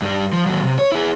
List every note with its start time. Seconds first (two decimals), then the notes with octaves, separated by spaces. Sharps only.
0.02 G2 G3
0.33 F3
0.46 D#2 F#3
0.63 C3
0.79 C#5
0.92 E4 G#4